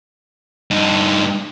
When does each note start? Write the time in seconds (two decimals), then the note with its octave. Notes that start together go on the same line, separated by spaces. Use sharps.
0.71 G2 D#4